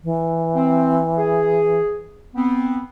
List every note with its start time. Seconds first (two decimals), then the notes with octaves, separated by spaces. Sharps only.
0.04 E3
0.55 C4
1.18 G#4
2.35 B3 C4